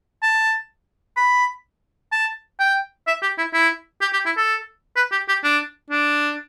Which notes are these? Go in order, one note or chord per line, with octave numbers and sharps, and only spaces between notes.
A5
B5
A5
G5
E5
G4
E4
E4
G4
G4
E4
A4
B4
G4
G4
D4
D4